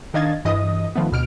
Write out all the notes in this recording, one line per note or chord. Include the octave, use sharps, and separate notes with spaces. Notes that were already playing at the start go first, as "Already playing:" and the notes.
D#3 D4 D#5 F5 G#6 A6
G2 E3 D#5 D#6
D#3 F3 A3 B3
D2 B2 F6 D7